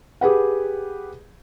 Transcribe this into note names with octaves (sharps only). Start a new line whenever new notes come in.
G4 G#4 B4 F#5